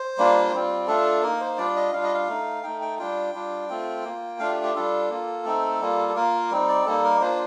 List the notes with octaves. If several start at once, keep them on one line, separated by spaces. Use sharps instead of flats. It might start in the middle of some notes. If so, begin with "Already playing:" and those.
Already playing: C5
G3 A#3 D4 F4
G3 C4 F4
A3 D4 F4 A4
A#3 D#4 A#4
C5
G3 D4 F4 D5
D#5
G3 D4 F4 F5
D#5
F5
A3 D#4
A3 D#4 G5
G5
G3 D4 F4 G5
G3 D4 F4
A3 C4 F4
A#3 F4
A3 D4 F4 F5
G4
G4
G3 D4 F4 A4
A#3 F4
A3 C4 D#4
G3 A#3 F4
A4
A#3 F4 A#4
G3 C4 D#4
D5
G3 A#3 D#4 A4
A#4
A#3 D4 F4 C5